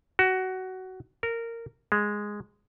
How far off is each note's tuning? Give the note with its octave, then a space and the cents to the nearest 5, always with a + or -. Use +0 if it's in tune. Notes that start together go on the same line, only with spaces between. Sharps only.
F#4 +15
A#4 -15
G#3 -5